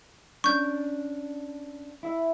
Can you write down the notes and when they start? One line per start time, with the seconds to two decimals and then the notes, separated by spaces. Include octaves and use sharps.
0.44 C#4 D4 C#6 G6
2.03 E4 E5